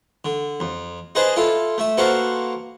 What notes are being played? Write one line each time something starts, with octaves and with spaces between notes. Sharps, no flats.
D3
F2
D#4 G#4 B4 C5 D#5 A5
E4 F4 A4
A3 E5
A#3 F#4 A4 B4 C5 F5